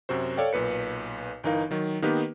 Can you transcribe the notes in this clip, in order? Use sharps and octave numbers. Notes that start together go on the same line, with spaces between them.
F#2 C3 F#4 C5
A4 C#5 D5 F5 G5
B1 A#2 B4 C#7
G1 E3 D#4 A#4 F5
D#3 F#3
D#3 A#3 B3 D#4 G4 B4